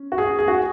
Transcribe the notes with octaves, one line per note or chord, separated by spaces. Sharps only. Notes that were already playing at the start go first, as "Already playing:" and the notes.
Already playing: C#4
F#4
G#4
G#4
F#4